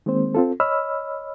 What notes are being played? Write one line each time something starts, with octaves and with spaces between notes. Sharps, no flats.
D#3 G#3 A#3 C4 C5
C4 F4 A4
C#5 D#5 B5 E6 F6